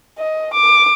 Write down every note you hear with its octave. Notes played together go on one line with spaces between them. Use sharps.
D#5
D6